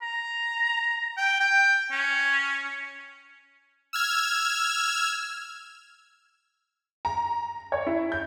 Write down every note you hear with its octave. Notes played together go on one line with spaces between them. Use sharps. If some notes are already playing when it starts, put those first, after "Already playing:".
A#5
G5
G5
C#4
E6 F6 G#6
A#5
C#5
E4
G6